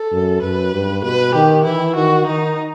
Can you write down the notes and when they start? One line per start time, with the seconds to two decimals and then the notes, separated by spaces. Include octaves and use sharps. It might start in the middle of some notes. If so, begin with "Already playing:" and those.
Already playing: A4
0.12 F#2
0.42 F#2 B4
0.73 G2
1.03 B2 B4
1.35 D#3 G4
1.64 E3 E4
1.96 D#3 F#4
2.26 D#3 D#4